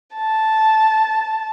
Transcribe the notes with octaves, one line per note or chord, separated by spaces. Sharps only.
A5